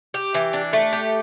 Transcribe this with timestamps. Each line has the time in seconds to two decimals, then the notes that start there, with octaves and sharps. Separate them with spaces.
0.14 G4
0.34 E3
0.53 D4
0.73 A3
0.93 G4